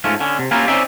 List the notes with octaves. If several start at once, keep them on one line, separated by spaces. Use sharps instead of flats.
G#2 A3 C#4 F4
D3 C#4
C3
A#3 C#4 E4 F4 G4 A#4
C4 C#4 D#4 D5 E5